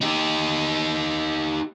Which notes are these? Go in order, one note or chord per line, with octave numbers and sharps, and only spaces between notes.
D#4 G4